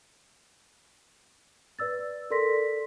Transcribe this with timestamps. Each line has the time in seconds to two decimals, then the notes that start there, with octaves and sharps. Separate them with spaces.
1.79 B4 D5 E6 A6
2.30 A4 A#4 D5 C6 A#6 B6